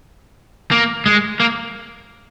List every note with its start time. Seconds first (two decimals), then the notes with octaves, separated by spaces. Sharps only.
0.71 A#3
1.06 G#3
1.40 A#3